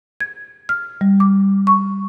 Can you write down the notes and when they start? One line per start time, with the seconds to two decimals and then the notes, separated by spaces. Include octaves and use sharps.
0.20 G#6
0.69 F6
1.01 G3
1.20 D6
1.67 C#6